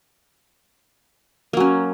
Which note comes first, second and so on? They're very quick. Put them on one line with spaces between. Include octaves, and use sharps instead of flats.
A#3 F#3 C#4